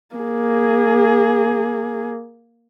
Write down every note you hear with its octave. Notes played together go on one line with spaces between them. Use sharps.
A#3 G#4